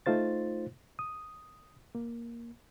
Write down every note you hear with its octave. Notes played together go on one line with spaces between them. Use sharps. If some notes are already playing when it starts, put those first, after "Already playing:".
A3 D#4 F4 C5 A6
D#6
A#3